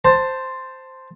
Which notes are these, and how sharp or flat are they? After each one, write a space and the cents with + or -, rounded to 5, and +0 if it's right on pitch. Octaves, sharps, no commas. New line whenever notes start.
C5 +0 A5 +15